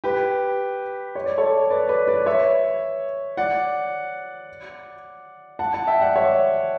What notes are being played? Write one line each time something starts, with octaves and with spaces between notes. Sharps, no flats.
G4 B4
C#5
D5
A4 C#5
B4 D5
B4 D5
B4 D5
C#5 E5
D5 F#5
F#5 A5
F#5 A5
E5 G5
D5 F#5
C#5 E5